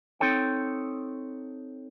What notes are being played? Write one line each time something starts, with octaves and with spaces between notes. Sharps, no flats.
C4 D#4 A4 C#5 G5